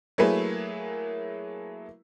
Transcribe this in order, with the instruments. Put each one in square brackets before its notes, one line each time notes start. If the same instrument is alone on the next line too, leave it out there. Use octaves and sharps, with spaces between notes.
[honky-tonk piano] F#3 A3 A#3 E4 G#4 B4